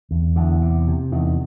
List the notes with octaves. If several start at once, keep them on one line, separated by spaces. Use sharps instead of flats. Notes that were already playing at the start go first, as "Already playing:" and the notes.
E2
E2 D3
C3
C3
E2 D#3